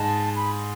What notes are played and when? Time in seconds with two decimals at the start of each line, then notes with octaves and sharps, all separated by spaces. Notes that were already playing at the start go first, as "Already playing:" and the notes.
Already playing: G#2 G#3 A5
0.36 B5